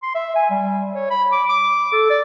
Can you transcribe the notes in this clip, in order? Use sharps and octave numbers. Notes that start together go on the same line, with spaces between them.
C6
E5
G#5
G3
C#5
B5
D6
D6
A4
D5